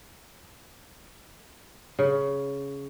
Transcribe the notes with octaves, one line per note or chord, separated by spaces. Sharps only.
C#3